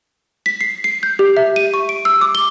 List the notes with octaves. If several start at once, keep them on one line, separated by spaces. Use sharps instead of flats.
B6
C7
C7
G6
G4
E5
D#7
C#6
D7
E6
D6
G7